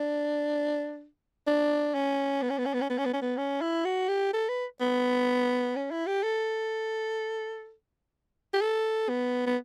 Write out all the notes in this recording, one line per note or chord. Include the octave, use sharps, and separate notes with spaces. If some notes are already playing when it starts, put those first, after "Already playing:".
Already playing: D4
D4
C#4
B3
C#4
B3
C#4
B3
C#4
B3
C#4
B3
C#4
B3
C#4
E4
F#4
G4
A4
B4
B3
C#4
E4
G4
A4
G4
A4
B3
B3